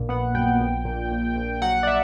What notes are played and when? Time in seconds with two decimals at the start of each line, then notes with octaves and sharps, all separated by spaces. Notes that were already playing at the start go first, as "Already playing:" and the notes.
Already playing: A#1 A#2
0.09 B3 F#5
0.34 F#2 G5
0.61 A#1
0.85 A#2
1.12 A#1
1.36 A#1
1.62 F#3 F#5
1.83 D5
1.87 E5